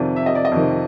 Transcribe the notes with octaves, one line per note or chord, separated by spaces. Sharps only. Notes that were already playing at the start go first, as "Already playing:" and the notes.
Already playing: F2 C3 D#3 D5
E5
D#5
D5
D#5
F2 C3 D#3